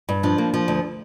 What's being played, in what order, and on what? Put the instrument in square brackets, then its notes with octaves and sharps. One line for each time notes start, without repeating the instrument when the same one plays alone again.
[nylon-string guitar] G2
F3 D4
A#3
F3
D2